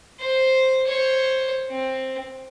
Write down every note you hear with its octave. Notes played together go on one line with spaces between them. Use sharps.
C5
C5 C#5
C4